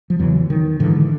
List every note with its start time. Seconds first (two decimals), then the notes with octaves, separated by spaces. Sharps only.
0.10 F3
0.19 E2 C#3 E3 F#3
0.50 D#3
0.80 G#2 D3 E3